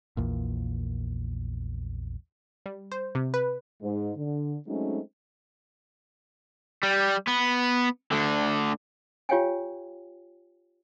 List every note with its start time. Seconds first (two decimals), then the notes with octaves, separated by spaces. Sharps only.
0.17 A#1 E2 A#2
2.66 G3
2.92 C5
3.15 C3
3.34 B4
3.82 G#2
4.17 D3
4.68 F#3 G#3 A3 C4 C#4 D#4
6.83 G3
7.28 B3
8.12 D2 D3
9.29 F4 G4 C#5 F5 G5 G#5